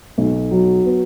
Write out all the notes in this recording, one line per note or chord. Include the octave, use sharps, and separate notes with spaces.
B1
F#3
B3